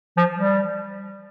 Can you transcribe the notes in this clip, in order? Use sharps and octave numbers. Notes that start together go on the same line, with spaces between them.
F3
G3